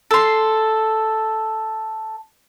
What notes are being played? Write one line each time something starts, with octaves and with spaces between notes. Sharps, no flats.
A4 C6